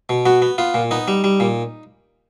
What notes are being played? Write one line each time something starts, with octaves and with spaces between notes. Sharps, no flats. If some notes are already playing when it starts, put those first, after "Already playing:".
B2
B3 F#4
B3
B3 F4
A#2
B3 D#4
G3
G3
A#2